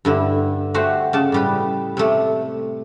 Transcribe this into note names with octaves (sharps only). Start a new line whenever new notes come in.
G2 D3 E4
A3 F#4 G4 C5
C#3 D5 A5
A2 G3 B4
C3 A3